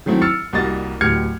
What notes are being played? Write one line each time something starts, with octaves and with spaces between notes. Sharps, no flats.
D#3 F#3 A3 C4 E4
E6 F6 A6 C#7
C2 G3 A#3 F#4 D#5 A6
D1 G4 F6 G#6 C#7